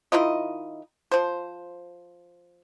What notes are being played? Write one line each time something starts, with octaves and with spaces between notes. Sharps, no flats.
D#3 E4 F4 D#5
F3 C5